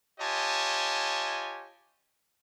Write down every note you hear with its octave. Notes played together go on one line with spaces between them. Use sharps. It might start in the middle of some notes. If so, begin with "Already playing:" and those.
F4 G4 C#5 D#5 G#5 A5